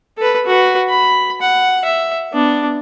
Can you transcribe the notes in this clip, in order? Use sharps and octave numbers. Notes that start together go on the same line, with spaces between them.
A4 B4
F#4 B4
B5
F#5
E5
B3 D4